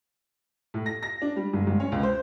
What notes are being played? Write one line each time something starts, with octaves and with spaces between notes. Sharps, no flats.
A2
A#6
A#6
D4
G3
G1
G1
C#4
C#2
C5